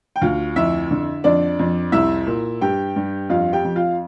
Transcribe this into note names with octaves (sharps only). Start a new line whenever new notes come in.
G5
D2 F4 F5
F2 E4 E5
D3
F2 D4 D5
F2
C2 E4 E5
A#2
G2 G4 G5
G2
F2 F4 F5
G4 G5
F2
F4 F5